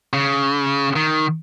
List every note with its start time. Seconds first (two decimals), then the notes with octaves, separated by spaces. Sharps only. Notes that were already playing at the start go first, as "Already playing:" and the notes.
0.13 C#3
0.96 D#3